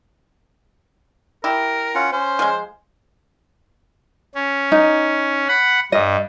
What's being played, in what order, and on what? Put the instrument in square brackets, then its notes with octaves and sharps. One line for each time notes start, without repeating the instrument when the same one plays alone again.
[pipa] E4 G4 [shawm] A#4
[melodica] C#4 F4 F#5
[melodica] C#4 [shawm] C5
[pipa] F3 G#3
[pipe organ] C#4
[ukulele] D#4
[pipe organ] F#5 B5
[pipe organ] G2 [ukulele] D#5